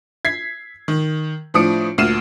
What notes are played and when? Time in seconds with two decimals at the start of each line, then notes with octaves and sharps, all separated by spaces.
0.25 G#6 B6 C7
0.88 D#3
1.54 A2 F3 D4 D#6 C#7 D7
1.98 D2 A#2 F6 C7 D#7 E7